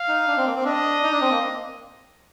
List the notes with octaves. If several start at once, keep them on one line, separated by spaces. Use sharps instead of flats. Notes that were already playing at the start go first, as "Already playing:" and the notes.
Already playing: F5
D#4
D4
C4
A#3
C4
D4 D#5
D#4
D4
C4
A#3